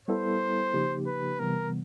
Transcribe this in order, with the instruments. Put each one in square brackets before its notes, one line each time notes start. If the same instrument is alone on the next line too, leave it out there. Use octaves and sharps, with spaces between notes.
[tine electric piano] G3 B3 E4 A4 [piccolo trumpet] C5
[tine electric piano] C#3 F3 A#3 D#4 G4
[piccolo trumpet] B4
[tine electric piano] C3 E3 G3 B3 [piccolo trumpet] A#4